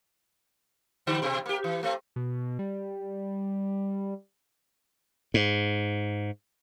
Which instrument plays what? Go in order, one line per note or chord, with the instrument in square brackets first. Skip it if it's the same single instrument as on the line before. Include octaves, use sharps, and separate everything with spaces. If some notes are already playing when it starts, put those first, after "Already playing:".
[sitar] D3 G3 G4
B2 C4
A#3 G4
E3
A3 C4
[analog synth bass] B2
G3
[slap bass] G#2